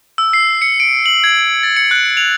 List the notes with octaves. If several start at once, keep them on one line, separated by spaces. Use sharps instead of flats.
E6
C7
C#7
D7
F#7
G#6
A6
C#7
F#6
F7